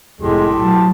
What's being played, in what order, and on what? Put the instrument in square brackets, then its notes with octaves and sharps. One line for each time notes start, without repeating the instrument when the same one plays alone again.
[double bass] F1 [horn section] A2 A4 C6 [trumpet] G#3 [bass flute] G4
[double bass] B1 F#3 [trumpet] A5